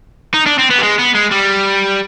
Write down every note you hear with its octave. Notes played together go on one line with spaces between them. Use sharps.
D#4
D4
C4
B3
G3
G#3
B3
G#3
G3